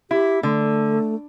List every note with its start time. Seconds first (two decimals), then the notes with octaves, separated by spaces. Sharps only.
0.11 E4 G4
0.43 D3 A3